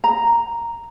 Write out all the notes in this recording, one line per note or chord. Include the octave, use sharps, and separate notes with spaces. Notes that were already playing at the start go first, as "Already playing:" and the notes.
A#5